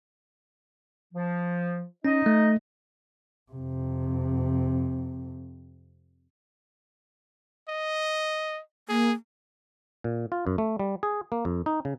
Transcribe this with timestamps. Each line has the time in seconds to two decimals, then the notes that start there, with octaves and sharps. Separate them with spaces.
1.14 F3
2.05 C#4 D#4 D#5
2.26 A3
3.52 F2 C3
7.69 D#5
8.89 A#3 G#4
10.04 A#2
10.32 F4
10.47 F#2
10.58 A3
10.80 G3
11.03 G#4
11.32 A#3
11.45 F2
11.66 D#4
11.85 C#3